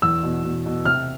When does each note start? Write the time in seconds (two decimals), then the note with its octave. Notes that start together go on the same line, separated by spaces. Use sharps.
0.02 E2 E6
0.23 B2
0.44 B2
0.66 B2
0.85 C3 F6